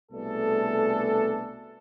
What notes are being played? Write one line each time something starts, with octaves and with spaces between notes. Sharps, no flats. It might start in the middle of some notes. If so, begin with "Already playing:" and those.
C2 B2 A3 D4 G#4 A4